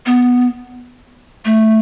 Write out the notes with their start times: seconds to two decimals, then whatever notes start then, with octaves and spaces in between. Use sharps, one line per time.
0.06 B3
1.45 A3